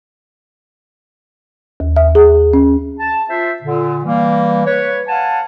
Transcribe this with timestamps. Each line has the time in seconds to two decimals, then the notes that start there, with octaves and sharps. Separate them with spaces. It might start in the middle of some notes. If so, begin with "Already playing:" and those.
1.80 D#2
1.96 E5
2.15 G#4
2.53 C#4
3.00 A5
3.29 F4 C5 E5
3.63 A#2 D3
4.04 E3 G3 A#3
4.67 B4 C#5
5.08 F5 F#5 G#5 A5